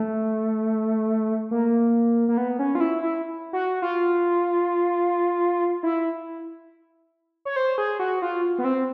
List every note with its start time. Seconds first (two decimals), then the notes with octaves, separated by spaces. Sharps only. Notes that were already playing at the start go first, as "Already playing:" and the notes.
Already playing: A3
1.51 A#3
2.28 A#3
2.37 B3
2.59 C#4
2.75 F4
2.80 E4
3.02 E4
3.53 F#4
3.82 F4
5.83 E4
7.45 C#5
7.56 C5
7.78 G#4
7.99 F#4
8.22 F4
8.58 B3
8.64 C4